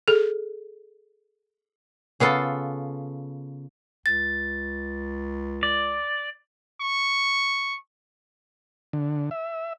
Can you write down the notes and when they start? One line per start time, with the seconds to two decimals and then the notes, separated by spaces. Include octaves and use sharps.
0.08 G#4 A4
2.20 C#3 B3 F4 A4
4.06 C#2 A6
5.63 D5
6.81 C#6
8.93 D3
9.31 E5